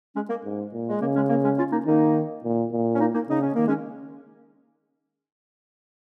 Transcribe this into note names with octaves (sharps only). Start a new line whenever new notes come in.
G#3 C#4
A#3
G#2
A#2
G#3
C#3 A#3
G#3 C#4
A#3
G#3 C#4
C#4 F4
A#3 D#4
D#3 A#3 D#4
A#2
A#2
C#4
A#3 D#4
A#3 D#4
C#3 D#4
C#4
D#3 A#3
G#3 C#4